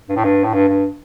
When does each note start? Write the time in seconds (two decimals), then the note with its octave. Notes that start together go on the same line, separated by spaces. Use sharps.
0.09 G2
0.16 A2
0.24 G2
0.44 A2
0.54 G2
0.69 G2